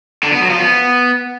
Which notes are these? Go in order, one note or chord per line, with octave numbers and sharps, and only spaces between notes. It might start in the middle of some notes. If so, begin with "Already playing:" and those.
D3
B3
F#3
F3
B3